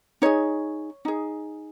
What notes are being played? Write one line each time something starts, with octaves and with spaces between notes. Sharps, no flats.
D#4 G#4 C#5
D#4 G#4